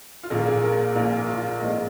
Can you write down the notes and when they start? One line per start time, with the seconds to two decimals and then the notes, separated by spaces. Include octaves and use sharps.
0.23 F4
0.30 A#1 A#2 A#3 G#4
0.46 G#4
0.63 A#4
0.95 A#1 A#2 A#3 F4
1.28 F4
1.61 A#1 G#2 G#3 C4 D#5